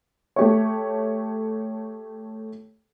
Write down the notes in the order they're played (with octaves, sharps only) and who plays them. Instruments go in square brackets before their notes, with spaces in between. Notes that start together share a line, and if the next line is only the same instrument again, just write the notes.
[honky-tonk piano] A3 G4 C#5